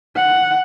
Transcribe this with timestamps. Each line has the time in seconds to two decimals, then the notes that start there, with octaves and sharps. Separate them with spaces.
0.16 F#5